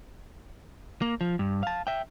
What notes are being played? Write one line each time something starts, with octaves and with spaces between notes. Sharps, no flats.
A#3
F3
G2
F5 A5
E5 G5